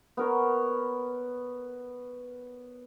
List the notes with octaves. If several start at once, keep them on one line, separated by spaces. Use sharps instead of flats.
B3 A#4 C#5